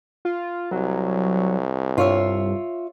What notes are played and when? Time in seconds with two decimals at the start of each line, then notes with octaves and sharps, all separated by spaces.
0.25 F4
0.72 C2 F#3
1.98 G2 F4 C#5 E5